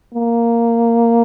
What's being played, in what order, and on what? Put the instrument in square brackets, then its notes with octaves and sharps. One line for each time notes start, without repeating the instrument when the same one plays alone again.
[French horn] A#3